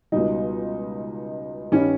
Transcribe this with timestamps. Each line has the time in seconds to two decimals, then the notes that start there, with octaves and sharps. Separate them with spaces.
0.12 C#2 B2 G3 D#4
1.72 G2 D#3 G3 C#4